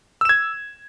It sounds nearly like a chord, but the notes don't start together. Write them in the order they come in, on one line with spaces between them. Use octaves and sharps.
E6 E7 G#6